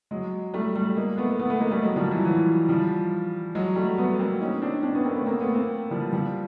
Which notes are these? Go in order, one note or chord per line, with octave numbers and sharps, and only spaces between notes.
F#3 G#3
G3 A3
G3 A3
G#3 A#3
A3 B3
A3 B3
A3 B3
G#3 A#3
G3 A3
F#3 G#3
F3 G3
E3 F#3
E3 F#3
F3 G3
F#3 G#3
G3 A3
A3 B3
A#3 C4
C#4 D#4
C4 D4
C4 D4
B3 C#4
A#3 C4
A3 B3
A#3 C4
A3 B3
A#3 C4
F3 G3
F3 G3